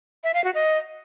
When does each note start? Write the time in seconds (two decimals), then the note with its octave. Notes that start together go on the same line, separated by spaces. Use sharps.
0.24 E5
0.34 F5
0.44 F#4
0.54 D#5